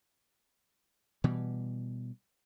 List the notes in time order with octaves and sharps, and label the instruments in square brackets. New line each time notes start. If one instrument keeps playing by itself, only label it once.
[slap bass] B2 E3 G3